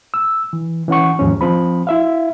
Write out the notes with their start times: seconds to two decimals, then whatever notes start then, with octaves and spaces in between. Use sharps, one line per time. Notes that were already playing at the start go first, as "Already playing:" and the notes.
0.14 E6
0.53 E3
0.88 E3 C#4 F#5 C#6
1.19 D#2 G#2 F3 C#4
1.41 F3 C4 B5
1.87 E4 E5 F5